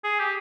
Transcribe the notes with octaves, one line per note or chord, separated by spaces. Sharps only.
G#4
G4